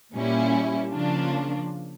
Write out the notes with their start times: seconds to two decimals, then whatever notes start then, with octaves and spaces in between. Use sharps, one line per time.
0.14 A#2 G3 C#4 E4
0.92 C#3 F3 A#3 D4 F4